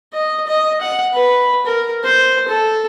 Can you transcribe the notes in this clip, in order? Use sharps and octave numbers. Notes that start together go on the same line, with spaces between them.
D#5
D#5
F#5
B4
A#4
C5
A4